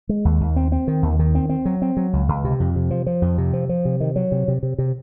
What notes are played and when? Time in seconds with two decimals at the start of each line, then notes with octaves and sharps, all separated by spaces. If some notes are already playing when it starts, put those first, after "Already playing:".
0.09 G#3
0.25 D#2
0.41 D#2
0.56 C4
0.72 C4
0.88 D#3
1.03 D#2
1.19 D#3
1.35 C4
1.49 C4
1.65 F#3
1.82 C4
1.97 F#3
2.13 C#2
2.28 C#2
2.44 C3
2.60 F2
2.76 C3
2.91 F3
3.06 F3
3.22 F2
3.38 C3
3.53 F3
3.69 F3
3.85 C3
4.00 D#3
4.16 F#3
4.32 C3
4.48 C3
4.63 C3
4.78 C3